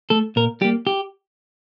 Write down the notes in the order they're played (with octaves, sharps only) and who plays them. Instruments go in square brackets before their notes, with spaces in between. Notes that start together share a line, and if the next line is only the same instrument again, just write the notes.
[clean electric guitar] A3 A4
A#2 A#4
G3 G4
A#3
G4